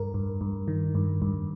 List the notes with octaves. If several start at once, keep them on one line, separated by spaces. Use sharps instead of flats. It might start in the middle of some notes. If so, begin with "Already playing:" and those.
Already playing: G2 A#4
G2
G2
D#3
G2
G2